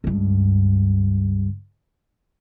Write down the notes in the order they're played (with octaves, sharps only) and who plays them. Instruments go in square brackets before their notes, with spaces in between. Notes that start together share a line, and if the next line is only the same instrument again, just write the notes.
[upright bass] C#2 G2